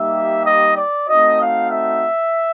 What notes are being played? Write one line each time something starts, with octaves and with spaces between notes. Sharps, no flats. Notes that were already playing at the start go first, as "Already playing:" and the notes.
Already playing: G3 A#3 D#4 G4 E5
D#5
D5
A3 C4 D#4 F#4 D#5
F5
E5